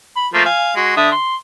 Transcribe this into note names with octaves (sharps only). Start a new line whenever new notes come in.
B5
F3 A3 A#3
F5 G#5
G#3 F#4
D3 E5 D#6
C6